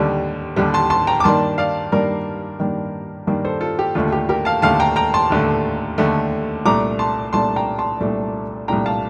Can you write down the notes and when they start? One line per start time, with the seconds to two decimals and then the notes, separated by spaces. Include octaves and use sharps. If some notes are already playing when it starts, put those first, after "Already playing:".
Already playing: D#2 D3 G3
0.56 D#2 D3 G3
0.74 A5 C6
0.90 A5 C6
1.07 G5 A#5
1.20 D6
1.24 G2 D#3 A#3 D4 A5 C6
1.58 D5 F5
1.92 G2 D#3 A#3 D4 A#4 D5
2.59 G2 D#3 A#3 D4
3.27 G2 D#3 A#3 D4
3.45 A4 C5
3.61 F4 A4
3.79 G4
3.95 D#2 D3 A3 F4
4.12 G4
4.29 G4 A#4
4.45 F5 A5
4.62 D#2 D3 A3 F5 A5
4.80 G5 A#5
4.96 G5 A#5
5.14 A5 C6
5.30 D#2 D3 A3
5.98 D#2 D3 A3
6.65 C2 A#2 A3 D4 A#5 D6
6.99 A5 C6
7.33 C2 A#2 A3 D4 A5 C6
7.56 G5 A#5
7.78 A5 C6
8.00 C2 A#2 A3 D4
8.68 C2 A#2 A3 D4 G5 A#5
8.86 F5 A5